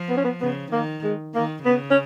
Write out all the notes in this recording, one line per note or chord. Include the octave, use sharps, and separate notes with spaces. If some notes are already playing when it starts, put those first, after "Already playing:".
Already playing: F3
B3
C#4
B3
C#3 B3
D#3 A#3
G#3
D#3 A#3
C#3 B3
C#4